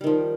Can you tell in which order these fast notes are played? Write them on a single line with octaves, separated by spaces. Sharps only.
G3 D#3 F3